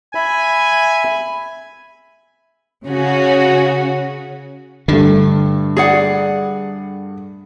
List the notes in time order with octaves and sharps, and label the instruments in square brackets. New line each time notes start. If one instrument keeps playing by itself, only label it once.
[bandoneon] E5 B5 [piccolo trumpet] G#5
[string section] C#3 C#4 F#4
[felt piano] G2 A3 [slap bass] D3
[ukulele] G#4 D5 F#5